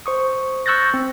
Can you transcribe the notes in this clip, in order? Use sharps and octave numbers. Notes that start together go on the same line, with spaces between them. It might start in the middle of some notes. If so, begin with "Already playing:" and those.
C5 C#6 D#6
C#6 E6 F#6 G6 A6 A#6
C4